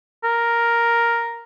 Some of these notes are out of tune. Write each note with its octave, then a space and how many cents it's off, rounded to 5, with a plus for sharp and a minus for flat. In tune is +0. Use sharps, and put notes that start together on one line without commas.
A#4 +5